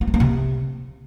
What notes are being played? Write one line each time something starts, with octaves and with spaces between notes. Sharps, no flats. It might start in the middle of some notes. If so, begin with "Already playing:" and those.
A#3
A3
A#3
C3